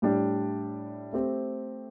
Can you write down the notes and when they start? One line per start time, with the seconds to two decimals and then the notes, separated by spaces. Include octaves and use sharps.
0.02 A2 G3 D4 G4 D5
1.13 A3 C4 G4 C5